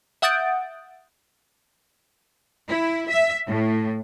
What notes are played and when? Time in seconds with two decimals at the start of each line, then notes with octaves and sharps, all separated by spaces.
0.22 E5 F#5 D#6 G6 A6 D7
2.68 E4
3.09 E5
3.47 A2